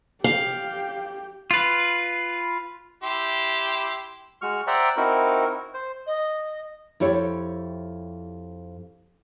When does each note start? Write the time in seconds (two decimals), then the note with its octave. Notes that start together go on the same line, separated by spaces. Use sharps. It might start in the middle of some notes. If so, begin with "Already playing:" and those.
0.24 G4 F5
1.51 F4 B4
3.03 E4 G4 C6
4.42 G#3 F#4 C#6 F6
4.67 C5 D5 E5 F#5 G5 A#5
4.97 C4 D#4 E4 F#4 A#4
5.74 C5
6.06 D#5
7.00 F2 E4 G4 C#5